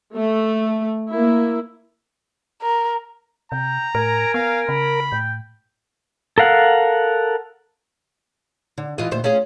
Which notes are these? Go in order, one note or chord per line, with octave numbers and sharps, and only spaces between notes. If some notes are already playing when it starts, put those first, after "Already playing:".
A3
A#3 E4
A#4
C3 G5 A#5
A2 A#4 G#5
B3 F5
C#3 B5
A2 G5
A4 A#4 F5 F#5
D3
E3 F4 D#5
D2 A#2 C5
C#4 F4 G#4